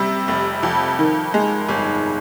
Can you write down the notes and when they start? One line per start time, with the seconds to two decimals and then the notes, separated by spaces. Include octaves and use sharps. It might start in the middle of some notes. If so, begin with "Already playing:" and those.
Already playing: C3 G3
0.28 F1
0.63 F2
0.99 D#3
1.34 G#3
1.69 G1